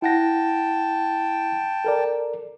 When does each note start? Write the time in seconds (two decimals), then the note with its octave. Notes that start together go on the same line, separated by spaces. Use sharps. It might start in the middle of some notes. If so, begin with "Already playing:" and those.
0.02 E4 F#5 G5 A5 A#6
1.85 A4 A#4 D5